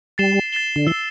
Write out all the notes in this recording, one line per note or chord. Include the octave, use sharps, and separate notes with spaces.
G3 A6 C7 E7 G7
A6 C7 E7 G7
D3
E3 E6 C7 G7